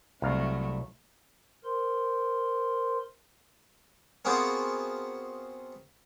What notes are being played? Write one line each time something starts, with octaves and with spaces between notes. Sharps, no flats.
C2 F#3 A3 F5
A#4 C5 C6
B3 C4 F4 F#4 G#4 A#4